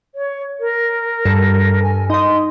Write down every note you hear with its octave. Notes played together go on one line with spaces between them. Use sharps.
C#5
A#4
G2 A4
G#5
D#4 D#5 C6